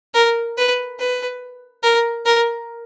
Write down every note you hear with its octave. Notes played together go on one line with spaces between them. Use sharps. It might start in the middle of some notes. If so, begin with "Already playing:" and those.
A#4
B4
B4
A#4
A#4